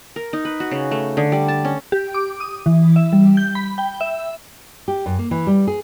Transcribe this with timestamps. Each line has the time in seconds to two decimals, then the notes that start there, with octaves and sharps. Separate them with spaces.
0.16 A#4
0.33 D#4
0.45 B4
0.60 F#4
0.71 C#3
0.91 A3
1.17 D3
1.32 G3
1.48 A5
1.65 C#4
1.92 G4
2.14 D6
2.40 D#6
2.66 E3
2.96 E5
3.13 G3
3.37 G6
3.55 B5
3.78 G5
4.01 E5
4.88 G4
5.06 F#2
5.19 A#3
5.31 E3
5.47 G3
5.67 G#4